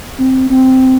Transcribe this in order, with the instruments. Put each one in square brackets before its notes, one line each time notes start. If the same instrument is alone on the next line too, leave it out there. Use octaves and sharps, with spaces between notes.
[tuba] C4
C4